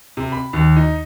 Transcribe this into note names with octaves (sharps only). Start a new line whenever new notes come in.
C3
B5
D#2
D#4